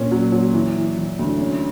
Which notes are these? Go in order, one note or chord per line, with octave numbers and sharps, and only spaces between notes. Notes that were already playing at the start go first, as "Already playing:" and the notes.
Already playing: A#2 C#4
F#3
F#3
E3
E3
E3
D2
C#4